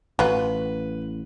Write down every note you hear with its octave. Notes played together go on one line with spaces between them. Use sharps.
A1 F#3 F4 B4